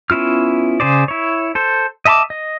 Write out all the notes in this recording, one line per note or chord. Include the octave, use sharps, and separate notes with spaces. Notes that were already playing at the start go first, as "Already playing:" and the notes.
B3 C#4 E4 F4 F6
C#3 G#4 C5 D5
E4 C#5
A4 C5
D#5 E5 A5 B5 D6
D#5